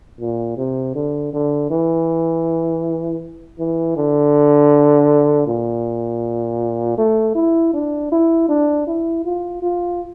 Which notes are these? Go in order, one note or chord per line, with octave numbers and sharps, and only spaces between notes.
A#2
C3
D3
D3
E3
E3
D3
A#2
A3
E4
D4
E4
D4
E4
F4
F4